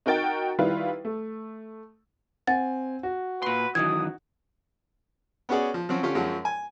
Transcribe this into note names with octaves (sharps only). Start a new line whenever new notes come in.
D#4 F#4 A#4 G5 A6
D#3 G3 E4 F4 B4
A3
C4 F#5 G#5 A6
F#4
A#2 B4 C6
F#2 D#3 E3 D#6 G#6
B3 C#4 F#4 G#4 D5
F3
F3 F#3 C4 C#4
D3 C#4 F4 G4
F#2 F3 F#3 G#3
G#5